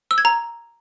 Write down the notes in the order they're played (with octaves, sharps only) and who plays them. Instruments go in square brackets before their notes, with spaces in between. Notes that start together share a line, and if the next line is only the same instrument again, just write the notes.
[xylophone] E6
G#6
A#5